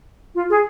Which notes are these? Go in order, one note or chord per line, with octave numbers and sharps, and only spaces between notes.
F4
G#4